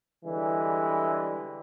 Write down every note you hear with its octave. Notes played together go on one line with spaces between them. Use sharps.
D3 E3 G3 G#3